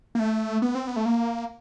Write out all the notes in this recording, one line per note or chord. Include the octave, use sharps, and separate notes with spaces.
A#3
A3
B3
C4
B3
A3
A#3